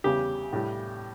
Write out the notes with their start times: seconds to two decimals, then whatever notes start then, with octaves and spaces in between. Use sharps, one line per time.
0.04 E2 C#3 E3 G3 G4
0.53 A2 G3